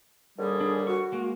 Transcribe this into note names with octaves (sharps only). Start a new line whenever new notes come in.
D#2 D3 G3 G#4
D4
F#4 C#6
G#3 A#3